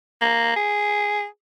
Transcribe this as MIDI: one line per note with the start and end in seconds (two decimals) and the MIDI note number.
0.21 0.54 58
0.56 1.25 68